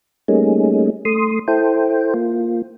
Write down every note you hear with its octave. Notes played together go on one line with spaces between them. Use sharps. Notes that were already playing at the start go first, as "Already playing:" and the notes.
G3 A3 A#3 C#4 D#4 G#4
A3 C6 D#6
E4 A4 C5 G5
A#3 F4